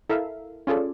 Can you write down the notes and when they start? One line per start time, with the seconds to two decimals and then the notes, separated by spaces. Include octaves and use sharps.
0.09 E4 A4 A#4 E5 F5
0.67 C#4 F4 G#4 A4 D5